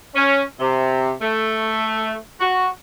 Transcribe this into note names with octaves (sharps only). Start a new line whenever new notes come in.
C#4
C3
A3
F#4